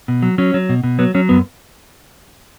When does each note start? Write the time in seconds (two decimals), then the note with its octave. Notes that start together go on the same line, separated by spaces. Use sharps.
0.08 B2
0.22 F#3
0.38 F#3 C#4
0.54 F#3
0.69 B2
0.84 B2
0.99 F#3 B3
1.15 F#3 C#4
1.29 F#2 B3